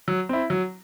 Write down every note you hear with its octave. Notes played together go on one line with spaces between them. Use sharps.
F#3
C4 E4
F#3